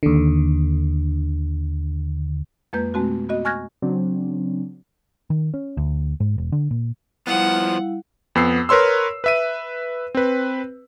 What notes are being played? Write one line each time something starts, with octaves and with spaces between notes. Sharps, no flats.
D#2 D3
F2 G#3 A#3 B4 G6
B2 G#3 A3 C4 F#4
B3 F#4 D#5
G#5 C#6 F6 F#6 G#6 A#6
C#3 F#3 C4 D4
D#3
C#4
D2
G#2
E1
D3
A#2
F3 G3 B3 E4 F5 F#5
F2 B3 E6 C7
A#4 B4 C#5 C6 E6
B4 E5 D#7
C4 B4